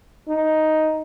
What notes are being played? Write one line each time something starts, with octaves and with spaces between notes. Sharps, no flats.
D#4